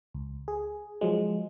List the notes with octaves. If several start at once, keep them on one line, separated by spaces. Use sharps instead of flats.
C#2
G#4
F3 F#3 G#3